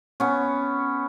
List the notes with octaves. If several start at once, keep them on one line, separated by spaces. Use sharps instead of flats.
B3 C#4